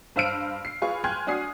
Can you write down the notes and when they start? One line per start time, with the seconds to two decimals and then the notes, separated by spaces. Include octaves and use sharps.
0.16 G2 C5 F5 E6 F6 D7
0.65 C7
0.82 F4 G#4 B4 F5 C#6
1.04 G5 G#5 C6 F6 F#6 G#6
1.27 D4 F#4 G#5 D#6 C7